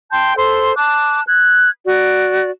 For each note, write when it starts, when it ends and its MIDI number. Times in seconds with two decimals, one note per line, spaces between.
0.12 0.33 79
0.12 0.33 81
0.12 0.33 84
0.12 0.33 91
0.36 0.74 69
0.36 0.74 72
0.36 0.74 84
0.77 1.21 81
0.77 1.21 86
0.77 1.21 90
1.28 1.69 90
1.28 1.69 92
1.85 2.50 66
1.85 2.50 74